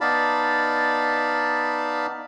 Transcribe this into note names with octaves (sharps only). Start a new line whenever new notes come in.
B3 D#4 D5 F5 A5 B5